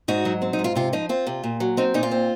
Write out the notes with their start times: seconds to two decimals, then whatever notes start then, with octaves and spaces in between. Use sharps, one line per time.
0.08 G#2 D#4 F#4
0.25 F#3
0.42 C4
0.53 D#4
0.59 G#2
0.64 F4
0.76 C3 F4
0.93 F3 D#4
1.09 C4 F4
1.27 C3
1.44 A#2
1.60 F#3
1.77 C4 D#4
1.94 A#2 D#4
2.03 F4
2.11 C4